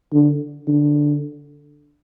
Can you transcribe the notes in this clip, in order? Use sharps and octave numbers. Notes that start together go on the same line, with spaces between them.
D3
D3